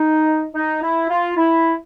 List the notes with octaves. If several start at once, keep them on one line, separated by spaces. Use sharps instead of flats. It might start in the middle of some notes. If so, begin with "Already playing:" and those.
Already playing: D#4
D#4
E4
F4
E4